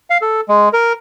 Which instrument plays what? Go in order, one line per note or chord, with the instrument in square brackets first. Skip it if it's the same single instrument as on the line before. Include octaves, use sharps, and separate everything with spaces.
[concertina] F5
A4
G#3
A#4